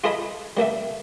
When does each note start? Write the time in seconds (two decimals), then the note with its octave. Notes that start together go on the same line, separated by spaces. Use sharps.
0.04 F4 G#4 A4 D#5 G#5 B5
0.57 G3 A#3 A4 E5